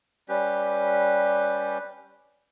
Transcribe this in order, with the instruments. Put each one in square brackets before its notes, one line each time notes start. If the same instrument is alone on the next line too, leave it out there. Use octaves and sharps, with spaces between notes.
[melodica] G3 C#4 G4 B4